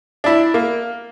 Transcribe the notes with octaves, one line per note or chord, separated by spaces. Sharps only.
D4 E4
A#3